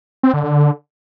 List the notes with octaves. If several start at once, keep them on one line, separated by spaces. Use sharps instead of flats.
C4
D3
D3